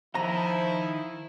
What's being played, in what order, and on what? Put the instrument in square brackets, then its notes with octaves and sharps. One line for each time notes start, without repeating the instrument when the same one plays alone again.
[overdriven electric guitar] D#3 [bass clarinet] F3 [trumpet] E4 [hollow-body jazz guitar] A#5